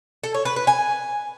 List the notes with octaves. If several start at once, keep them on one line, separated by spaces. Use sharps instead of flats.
A4
C#5
B4
B4
G#5